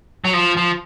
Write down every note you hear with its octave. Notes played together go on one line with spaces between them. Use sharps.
F#3
F3
F3